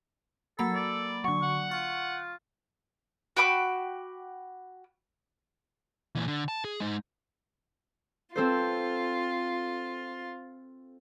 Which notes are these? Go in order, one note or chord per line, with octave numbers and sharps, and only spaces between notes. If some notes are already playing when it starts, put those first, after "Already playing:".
F#3 A#3 A4 B5
D5
D3 F#3 C#6
F#5
F4 C#6
F#4 G5 B5 D6
A#2 E3
D3
A5
G#4
G#3 D#4
C4 F4 A4 C5